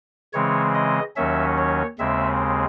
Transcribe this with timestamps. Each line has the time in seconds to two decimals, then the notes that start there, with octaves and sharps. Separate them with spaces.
0.33 C#3 E3 G#3 C4 C#5
0.75 D#5
1.16 D#2 D#3 F#3 C#4 E5
1.58 C#5
1.99 D#2 C#3 G#3 C4 E5